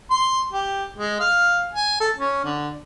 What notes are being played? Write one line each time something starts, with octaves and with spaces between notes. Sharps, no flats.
C6
G4
G#3
F5
G#5
A4
C#4
D3